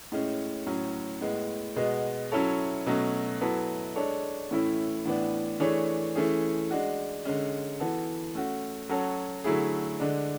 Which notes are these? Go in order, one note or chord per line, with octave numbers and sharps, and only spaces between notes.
A2 G#3 C#4
A2 F#3 C#4
A2 G#3 B3
B2 G#3 B3 F#4
F#3 C#4 E4 A4 C#5
B2 F#3 A3 C#4
F#3 B3 E4 A4
G#3 D4 A4 C#5
A2 E3 A3 C#4 E4
A2 E3 B3 D4
E3 A3 D4 G#4 C#5
E3 A3 C#4 G#4
G#3 D4 F#4
D3 G#3 C#4
E3 B3 F#4 A4
A3 C#4 F#4
F#3 C#4 F#4 A4 C#5
D3 F#3 A3 E4 G#4
D3 G#3 D4